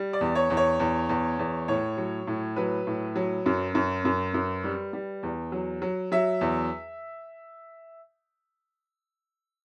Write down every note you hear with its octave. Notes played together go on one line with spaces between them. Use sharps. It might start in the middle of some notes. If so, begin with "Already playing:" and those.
Already playing: G3
D5
E2
C#5
E2
C#5
E2
E2
E2
A2 C#5
F#3
A2
F#3 B4
A2
F#3
F#2
F#2
F#2
F#2
G3
G3
E2
F#3
F#3
F#3 E5
E2